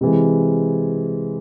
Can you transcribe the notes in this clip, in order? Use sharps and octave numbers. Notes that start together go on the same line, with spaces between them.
C3 E3 G#3